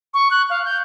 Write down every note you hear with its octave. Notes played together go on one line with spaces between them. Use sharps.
C#6
F#6
F5
G6